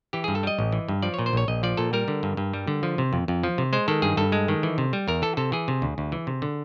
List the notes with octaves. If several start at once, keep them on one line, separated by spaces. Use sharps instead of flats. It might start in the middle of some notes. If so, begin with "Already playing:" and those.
E3 G4
G2 G#4
A4
G3 D#5
A1
E3
G2
F3 D5
A#2 C#5
C5
A#1 C#5
A#1 D#5
F3 D5
A#2 A4
G3 A#4
D3
G2
G2
G3
D3
F3
C3
F2
F2
F3
C3
G#3 C5
D#3 A4
G2 G#4
G2 A4
G#3
D#3
E3
C3
G3
E2 A#4
E3 A4
C3 A4
E3 G#4
C3
D2
D2
E3
C3
D3